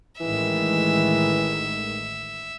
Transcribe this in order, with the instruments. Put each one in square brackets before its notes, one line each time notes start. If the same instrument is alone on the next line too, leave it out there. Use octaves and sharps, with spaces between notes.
[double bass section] A1 D#3 G#3 [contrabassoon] E3 [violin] E5